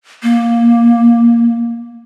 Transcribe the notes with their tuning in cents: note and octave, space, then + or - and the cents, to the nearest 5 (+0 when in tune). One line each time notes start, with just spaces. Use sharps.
A#3 +5